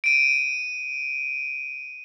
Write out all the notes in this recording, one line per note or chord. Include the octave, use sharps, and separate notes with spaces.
D7 D#7